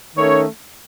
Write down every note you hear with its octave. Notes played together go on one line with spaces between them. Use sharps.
D#3 A3 C#4 C#5